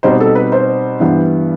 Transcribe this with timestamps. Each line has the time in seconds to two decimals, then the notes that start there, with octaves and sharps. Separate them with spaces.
0.03 B2 G3 C4 D#4 C5
0.20 A4
0.35 B4
0.52 C5
1.00 G2 E3 G3 B3